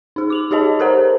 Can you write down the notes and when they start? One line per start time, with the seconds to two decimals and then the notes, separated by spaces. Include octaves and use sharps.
0.16 D#4 G#4
0.30 D6 F7 F#7
0.51 D#4 G4 G#4 C#5 D#5 A5
0.79 G4 A4 A#4 C5 F#5 A#5